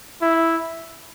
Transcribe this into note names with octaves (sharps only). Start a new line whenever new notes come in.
E4